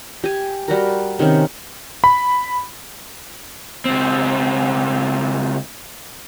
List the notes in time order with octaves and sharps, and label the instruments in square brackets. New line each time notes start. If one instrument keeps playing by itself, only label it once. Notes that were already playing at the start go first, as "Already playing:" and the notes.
[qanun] G4 G#5
G3 F#4 A#4
C3 D#3 C#4
[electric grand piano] B5
[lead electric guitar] C#2 C4